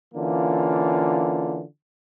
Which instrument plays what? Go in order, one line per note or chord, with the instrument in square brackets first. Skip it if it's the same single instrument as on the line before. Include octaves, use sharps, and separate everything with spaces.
[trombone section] D3 E3 A#3 C#4 F4